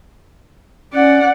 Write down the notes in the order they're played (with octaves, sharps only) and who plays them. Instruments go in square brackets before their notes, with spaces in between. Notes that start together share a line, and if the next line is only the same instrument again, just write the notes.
[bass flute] C#4 [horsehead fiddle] D5 F#5